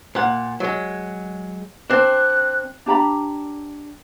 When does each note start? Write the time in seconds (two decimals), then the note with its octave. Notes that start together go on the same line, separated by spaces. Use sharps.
0.15 A#2 F#5
0.60 F#3 G#3
1.90 C4 D4 F#6
2.86 D4 G4 A#5 B5